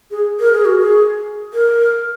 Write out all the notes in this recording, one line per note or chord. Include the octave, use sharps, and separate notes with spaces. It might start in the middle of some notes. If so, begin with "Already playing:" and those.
G#4
A#4
G#4
F#4
G#4
A#4